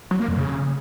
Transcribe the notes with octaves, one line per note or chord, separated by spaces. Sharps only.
F#3
A#3
F2
C#3